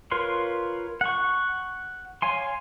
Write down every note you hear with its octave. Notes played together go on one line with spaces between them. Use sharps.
F4 A#4 B4 C#5 C6
F#5 C#6
C#5 F5 G#5 C6